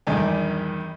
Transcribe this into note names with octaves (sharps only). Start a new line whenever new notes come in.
A#1 E2 G2 D#3 D5 G#5